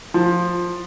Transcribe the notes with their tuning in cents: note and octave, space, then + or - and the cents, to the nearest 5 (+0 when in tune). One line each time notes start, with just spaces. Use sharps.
F3 +10